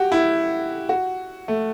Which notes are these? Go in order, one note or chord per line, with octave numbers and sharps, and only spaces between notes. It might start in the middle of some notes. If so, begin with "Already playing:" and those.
Already playing: F#4 G4
E4
F#4
A3